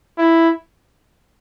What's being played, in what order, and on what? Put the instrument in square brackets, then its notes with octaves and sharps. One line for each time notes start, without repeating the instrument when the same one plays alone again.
[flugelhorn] E4